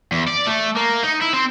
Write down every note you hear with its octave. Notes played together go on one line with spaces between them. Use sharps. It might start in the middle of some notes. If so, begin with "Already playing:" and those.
E2
D5
A3
A#3
D#4
E4
C4